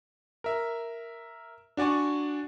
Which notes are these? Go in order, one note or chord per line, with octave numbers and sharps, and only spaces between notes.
A#4 E5
D4 F#4 D5 G#5 C#6